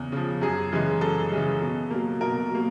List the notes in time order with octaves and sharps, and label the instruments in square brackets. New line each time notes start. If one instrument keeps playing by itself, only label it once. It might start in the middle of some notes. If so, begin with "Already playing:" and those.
Already playing: [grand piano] E2 C#3
C#3 F3
F#2 G#4
C#3 E3 G#3
F#2 A4
C#3 E3 G#3
B2
F#3 A#3
B2 A#4
F#3 A#3